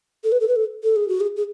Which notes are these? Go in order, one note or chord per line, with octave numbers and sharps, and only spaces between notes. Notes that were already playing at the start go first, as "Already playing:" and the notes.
A4
B4
A4
B4
A4
A4
G#4
F#4
G#4
G#4